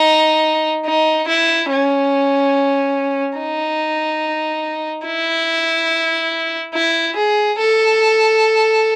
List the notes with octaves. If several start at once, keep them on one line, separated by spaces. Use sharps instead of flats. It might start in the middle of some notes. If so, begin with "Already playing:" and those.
Already playing: D#4
D#4
E4
C#4
D#4
E4
E4
G#4
A4